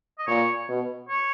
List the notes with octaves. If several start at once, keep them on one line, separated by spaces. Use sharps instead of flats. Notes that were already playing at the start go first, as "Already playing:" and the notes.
D#5
A#2 C#5
B2
C#5